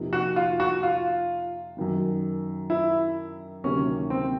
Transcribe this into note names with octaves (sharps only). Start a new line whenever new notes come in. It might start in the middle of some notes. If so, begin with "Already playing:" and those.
Already playing: F2 C3 F3 A#3 D#4
F#4
F4
F#4
F4
F#2 D#3 F#3
E4
D2 C3 D#3 F#3 A#3 C#4
C4